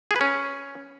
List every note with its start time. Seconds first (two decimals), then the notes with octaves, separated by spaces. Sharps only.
0.11 G#4
0.16 B4
0.21 C#4